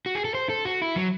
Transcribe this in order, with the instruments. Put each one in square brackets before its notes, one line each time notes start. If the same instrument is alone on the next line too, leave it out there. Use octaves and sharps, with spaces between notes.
[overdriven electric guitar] F#4
G#4
A4
C5
A4
F#4
E4
F#3